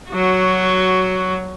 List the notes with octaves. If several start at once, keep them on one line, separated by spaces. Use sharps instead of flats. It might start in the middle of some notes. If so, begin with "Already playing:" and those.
F#3 F#4